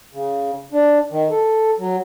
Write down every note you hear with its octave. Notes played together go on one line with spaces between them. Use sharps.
C#3
D4
D#3
A4
F#3